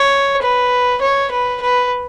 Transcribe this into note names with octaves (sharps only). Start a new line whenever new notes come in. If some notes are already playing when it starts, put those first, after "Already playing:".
Already playing: C#5
B4
C#5
B4
B4